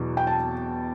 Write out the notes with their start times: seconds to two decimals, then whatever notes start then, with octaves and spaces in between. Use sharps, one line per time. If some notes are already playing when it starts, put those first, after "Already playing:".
Already playing: E2 B2 F#3
0.17 G5
0.27 A5